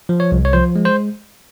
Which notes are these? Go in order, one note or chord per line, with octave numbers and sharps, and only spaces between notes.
F3
C#5
C2
C#5
F3 C5
G#3
C5